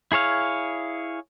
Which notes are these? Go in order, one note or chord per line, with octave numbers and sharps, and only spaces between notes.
E4 G#4 C#5 F5